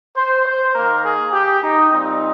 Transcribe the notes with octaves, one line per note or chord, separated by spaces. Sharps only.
C5
C5
D#3 A#3 A#4
G#4
G4
D#4
A#2 G3 C4 D#4